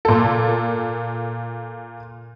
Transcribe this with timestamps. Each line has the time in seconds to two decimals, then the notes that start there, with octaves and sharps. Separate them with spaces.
0.05 A#2 A4